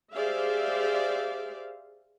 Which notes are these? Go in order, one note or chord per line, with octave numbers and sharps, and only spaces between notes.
G4 G#4 C5 D5 E5 F5